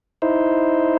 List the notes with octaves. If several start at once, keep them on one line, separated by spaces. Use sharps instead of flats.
D#4 E4 C5